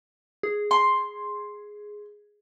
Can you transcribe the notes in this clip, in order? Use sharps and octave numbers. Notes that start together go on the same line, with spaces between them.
G#4
C6